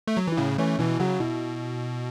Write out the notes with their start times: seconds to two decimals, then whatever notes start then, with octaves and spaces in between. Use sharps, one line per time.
0.08 A3
0.17 F#3
0.27 E3 E4
0.37 A2 C#3 C#4
0.58 E3 A3 C#4
0.79 B2 E3 E4
0.99 C#3 F#3 F#4
1.20 B2 E4